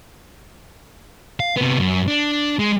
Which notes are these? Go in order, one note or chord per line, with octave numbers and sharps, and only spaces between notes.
F5
C3 B3
F#2
D4
G#3